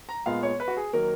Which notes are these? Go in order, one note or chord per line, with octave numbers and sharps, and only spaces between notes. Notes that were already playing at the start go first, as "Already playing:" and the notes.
A#5
A#2 G#3 B3 F5
C#5
B4
F#4
G#4
D#3 F#3 A#3 A#4